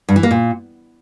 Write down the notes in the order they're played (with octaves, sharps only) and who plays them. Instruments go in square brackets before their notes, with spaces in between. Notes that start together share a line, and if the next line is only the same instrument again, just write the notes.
[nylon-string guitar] G2
E3
A#3
A#2